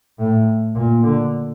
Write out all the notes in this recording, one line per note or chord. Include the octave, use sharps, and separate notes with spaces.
A2
A#2
D3